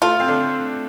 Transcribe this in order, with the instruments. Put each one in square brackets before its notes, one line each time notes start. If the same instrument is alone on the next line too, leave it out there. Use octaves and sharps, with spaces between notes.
[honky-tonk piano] A3 A4 [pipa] F4
[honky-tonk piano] C4
D3 D4